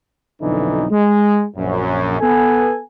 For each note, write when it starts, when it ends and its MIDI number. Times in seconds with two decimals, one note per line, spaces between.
0.41 0.85 35
0.41 0.85 41
0.41 0.85 50
0.41 0.85 52
0.41 0.85 63
0.91 1.43 56
1.57 2.20 34
1.57 2.20 42
2.21 2.79 59
2.21 2.79 69
2.21 2.79 80